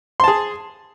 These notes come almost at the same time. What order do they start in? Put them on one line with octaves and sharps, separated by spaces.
C6 A5 G#4